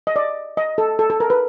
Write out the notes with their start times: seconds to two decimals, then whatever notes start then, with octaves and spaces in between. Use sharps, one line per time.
0.07 D#5
0.16 D5
0.57 D#5
0.78 A4
0.99 A4
1.10 A4
1.20 A#4
1.30 B4